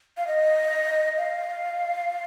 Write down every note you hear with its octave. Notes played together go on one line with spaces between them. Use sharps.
F5
D#5
F5